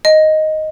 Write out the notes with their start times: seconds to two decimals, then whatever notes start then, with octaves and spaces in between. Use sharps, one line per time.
0.05 D#5